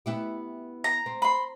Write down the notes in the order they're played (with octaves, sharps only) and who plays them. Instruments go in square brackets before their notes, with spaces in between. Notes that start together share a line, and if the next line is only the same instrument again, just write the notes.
[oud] B3 E4 G4
[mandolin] A#5
[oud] C4
[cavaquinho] B5 C6